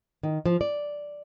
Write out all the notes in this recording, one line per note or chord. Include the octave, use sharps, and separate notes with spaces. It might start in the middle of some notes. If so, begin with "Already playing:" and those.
D#3
F3
D5